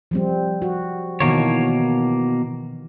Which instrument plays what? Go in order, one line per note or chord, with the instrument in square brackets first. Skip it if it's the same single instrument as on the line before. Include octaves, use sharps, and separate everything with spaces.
[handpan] F3 G3 C4
F#4
[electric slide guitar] B2 A#3 C#5 [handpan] D#3 E3